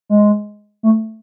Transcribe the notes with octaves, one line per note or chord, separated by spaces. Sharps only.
G#3
A3